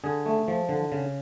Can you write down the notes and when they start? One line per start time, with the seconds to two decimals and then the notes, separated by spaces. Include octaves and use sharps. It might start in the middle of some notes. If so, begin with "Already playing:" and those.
0.04 D3 G#4
0.26 A3
0.48 F3
0.69 D3
0.92 C#3